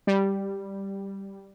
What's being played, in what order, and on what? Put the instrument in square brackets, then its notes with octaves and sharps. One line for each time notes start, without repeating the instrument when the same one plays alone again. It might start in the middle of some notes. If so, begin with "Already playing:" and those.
[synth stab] G3